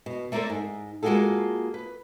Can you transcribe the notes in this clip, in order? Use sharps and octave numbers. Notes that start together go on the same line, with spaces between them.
B2
A3 A#3 A4 A#4 C5 D5
G#2
G#3 A#3 F4 F#4 G#4 A4
B4